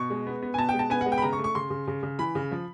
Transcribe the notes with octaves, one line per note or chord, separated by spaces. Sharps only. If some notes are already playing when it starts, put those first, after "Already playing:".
Already playing: B2 C#6
G#3
B3
B3
G#5
B2 A5
G5
G#3
A5
B3 G#5
F#5
G#3
G5
B5
C#3 A#5
C#6
A3
C#6
C#3 C6
C#3
C#3
C#3
E3 B5
C#3
F3